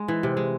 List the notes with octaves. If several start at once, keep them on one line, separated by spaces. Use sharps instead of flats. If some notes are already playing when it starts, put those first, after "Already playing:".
Already playing: G#3
E3
C3
G#3